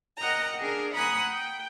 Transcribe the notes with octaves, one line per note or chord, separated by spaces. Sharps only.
A#4 D#5 F#5 G5 A#5
D4 G#4 A#4
F#5 G#5 A#5 B5 D#6 F#6
G5